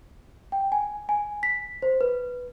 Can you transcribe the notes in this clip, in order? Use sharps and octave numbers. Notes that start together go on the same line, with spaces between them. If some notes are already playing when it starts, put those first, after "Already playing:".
G5
G#5
G#5
B6
C5
B4